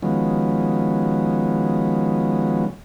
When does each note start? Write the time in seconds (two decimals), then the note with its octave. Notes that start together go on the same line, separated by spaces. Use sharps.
0.02 D#3 F3 F#3 G#3 B3 C#4